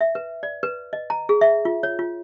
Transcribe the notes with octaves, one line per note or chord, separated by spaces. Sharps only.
E5
B4
D5
B4
D#5
A#5
G#4
E5
F4
C#5
F4